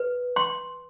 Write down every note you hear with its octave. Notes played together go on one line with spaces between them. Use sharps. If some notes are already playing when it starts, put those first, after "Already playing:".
Already playing: B4
C6